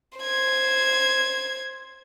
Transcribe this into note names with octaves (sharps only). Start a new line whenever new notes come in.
C5 G#6